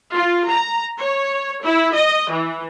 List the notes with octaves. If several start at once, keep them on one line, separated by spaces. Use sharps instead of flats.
F4
A#5
C#5
E4
D#5
E3